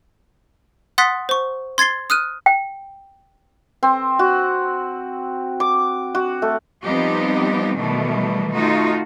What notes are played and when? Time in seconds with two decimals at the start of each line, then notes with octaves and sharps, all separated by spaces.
0.98 F#5 C6 D#6 F#6 A6 B6
1.29 C5 C#6
1.78 C6 G#6 A6 C7 G7
2.10 D#6 F6 F#6 D#7
2.46 G5
3.83 C4
4.19 F#4
5.60 D6
6.15 F#4
6.42 A3
6.84 F3 G3 B3 C4 D#4 G4
7.76 B2 D#3 E3 F#3 G3 A3
8.53 A3 D#4 F4 F#4